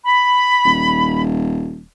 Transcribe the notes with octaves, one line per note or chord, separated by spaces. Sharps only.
B5
D#1